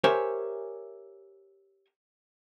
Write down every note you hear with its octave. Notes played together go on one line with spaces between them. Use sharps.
G4 A#4 C5 C#5 E5 G#5